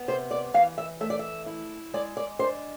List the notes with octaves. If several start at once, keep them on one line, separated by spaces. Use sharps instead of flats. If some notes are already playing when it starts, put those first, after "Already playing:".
Already playing: B3
C3 C5
D5
E3 F5
E5
A3 E5
D5
E5
E4
G#3 D5
D5
D4 C5